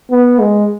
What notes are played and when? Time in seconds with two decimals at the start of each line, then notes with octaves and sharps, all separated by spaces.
0.11 B3
0.40 G#3